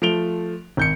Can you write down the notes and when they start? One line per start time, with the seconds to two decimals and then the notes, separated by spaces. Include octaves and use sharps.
0.02 F3 A3 D7 F7 G7
0.77 G#1 G6 C#7